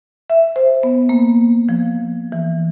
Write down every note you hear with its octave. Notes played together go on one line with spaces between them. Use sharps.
E5
C5
B3
A#3
F3
E3